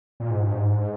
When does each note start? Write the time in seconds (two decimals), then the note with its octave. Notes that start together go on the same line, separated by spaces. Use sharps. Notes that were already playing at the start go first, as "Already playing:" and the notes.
0.20 A#2
0.30 G#2
0.42 G2
0.53 G#2